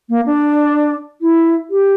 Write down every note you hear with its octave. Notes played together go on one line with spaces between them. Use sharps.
A#3
D4
E4
G4